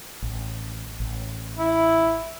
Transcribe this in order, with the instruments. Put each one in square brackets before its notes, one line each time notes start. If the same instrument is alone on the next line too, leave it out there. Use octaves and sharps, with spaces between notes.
[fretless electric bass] A1
A1
[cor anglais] E4